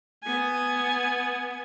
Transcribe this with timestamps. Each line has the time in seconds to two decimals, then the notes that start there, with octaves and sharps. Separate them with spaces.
0.24 B3 G#5